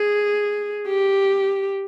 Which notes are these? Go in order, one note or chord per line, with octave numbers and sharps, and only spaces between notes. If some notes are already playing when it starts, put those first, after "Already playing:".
Already playing: G#4
G4